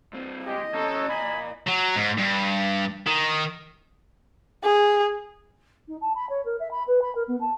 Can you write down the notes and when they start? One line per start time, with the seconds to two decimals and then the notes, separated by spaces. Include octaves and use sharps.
0.13 G2 C4
0.45 G#3 G4 D#5
0.74 C#4 A4 C#5 A#5
1.09 A#2 G#5 A#5 B5
1.68 F#3
1.96 G#2
2.18 G2
3.07 D#3
4.63 G#4
5.87 D#4
6.01 A5
6.15 B5
6.29 C#5
6.45 A#4
6.59 E5
6.71 B5
6.87 B4
7.01 B5
7.15 A#4
7.27 B3
7.40 A5